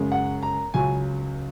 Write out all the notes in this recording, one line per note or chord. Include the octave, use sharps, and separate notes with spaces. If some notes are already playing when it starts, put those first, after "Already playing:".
Already playing: F#2 C#3 G#3
F#5
A#5
C#2 C#3 F#3 G#5